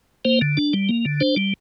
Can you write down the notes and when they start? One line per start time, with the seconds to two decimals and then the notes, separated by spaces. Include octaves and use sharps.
0.25 A#3 C5
0.42 D3
0.57 D4
0.73 G3
0.89 A#3
1.05 D3
1.20 D4 C5
1.37 G3